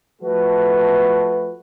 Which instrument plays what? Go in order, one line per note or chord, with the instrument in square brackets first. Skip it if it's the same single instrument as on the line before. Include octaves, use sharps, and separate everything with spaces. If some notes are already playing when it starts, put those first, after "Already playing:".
[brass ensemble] F3 A3 F#4 A4 B4